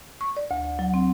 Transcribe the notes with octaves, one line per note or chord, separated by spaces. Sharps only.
C#6
D5
D2
F#3
C4